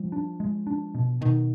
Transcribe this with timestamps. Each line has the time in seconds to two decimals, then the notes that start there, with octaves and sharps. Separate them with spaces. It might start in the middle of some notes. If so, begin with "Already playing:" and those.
Already playing: F3 G3
0.12 D4
0.40 G#3
0.67 D4
0.95 B2
1.21 B2 D#3